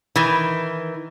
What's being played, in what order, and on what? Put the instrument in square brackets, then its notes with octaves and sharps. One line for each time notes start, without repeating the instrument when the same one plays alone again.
[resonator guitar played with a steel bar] D#3 E3